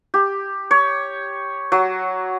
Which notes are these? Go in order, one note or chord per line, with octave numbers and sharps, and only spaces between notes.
G4
C#5
F#3